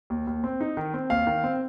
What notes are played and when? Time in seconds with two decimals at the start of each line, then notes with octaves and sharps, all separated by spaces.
0.10 D#2
0.27 D#2
0.44 C4
0.61 D#4
0.77 D#3
0.94 C4
1.10 D#2 F5
1.27 D#3
1.44 C4